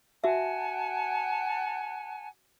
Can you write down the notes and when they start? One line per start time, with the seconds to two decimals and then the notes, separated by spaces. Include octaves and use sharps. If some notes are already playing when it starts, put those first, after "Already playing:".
0.24 F#4 E5 F#5 G#5 A5